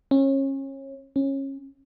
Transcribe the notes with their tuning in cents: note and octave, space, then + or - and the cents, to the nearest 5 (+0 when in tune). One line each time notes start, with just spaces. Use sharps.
C#4 -30
C#4 -25